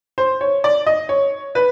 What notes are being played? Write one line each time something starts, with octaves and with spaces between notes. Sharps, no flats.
C5
C#5
D5
D#5
C#5
B4